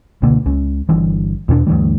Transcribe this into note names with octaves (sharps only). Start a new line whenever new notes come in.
C#2 B2 D3 A#3
C#2 C#3
G1 G2 E3
E2 B2 B3 D4
D2 G2 E3 G3